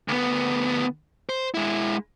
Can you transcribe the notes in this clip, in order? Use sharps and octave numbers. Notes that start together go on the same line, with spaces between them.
D2 B3
C5
G#3 E4